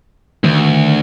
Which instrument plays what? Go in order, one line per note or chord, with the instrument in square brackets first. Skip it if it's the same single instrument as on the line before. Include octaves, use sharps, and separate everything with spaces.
[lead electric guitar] D2 [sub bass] D#3